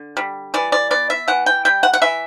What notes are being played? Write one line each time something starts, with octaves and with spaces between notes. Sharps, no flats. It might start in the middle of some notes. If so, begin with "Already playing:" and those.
Already playing: D3
G3
E3 D5
D5
B3 D5
E5
E3 F#5
G5
G3 G5
F#5
F#5
E3 E5